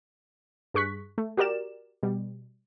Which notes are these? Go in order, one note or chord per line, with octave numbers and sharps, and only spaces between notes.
G2 G#4 C#6 F#6 B6
A3
F#4 G4 A#4 D5 E7
B2 G3